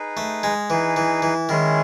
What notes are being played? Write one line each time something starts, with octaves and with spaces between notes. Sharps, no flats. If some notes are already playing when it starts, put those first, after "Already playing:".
Already playing: D#4 G#4 B4
A3
G#3
E3 D#4 G#4 B4
E3
E3
D#3 G#3 C#4 E4 G#4